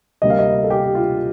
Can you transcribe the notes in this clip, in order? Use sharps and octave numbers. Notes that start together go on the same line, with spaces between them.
D2 C3 G3 A#3 D#5
F5
D#5
A4
G4
F4